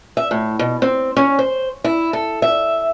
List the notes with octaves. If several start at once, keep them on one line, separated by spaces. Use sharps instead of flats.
E5
A2
B2
C4
C#4
C5
E4
A4
E5